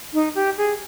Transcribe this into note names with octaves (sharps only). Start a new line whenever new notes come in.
D#4
G4
G#4